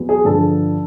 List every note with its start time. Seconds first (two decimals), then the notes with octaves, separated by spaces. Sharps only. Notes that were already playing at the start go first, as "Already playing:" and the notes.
Already playing: E2 F#3
0.09 G#4
0.25 G2 D3 F3 A4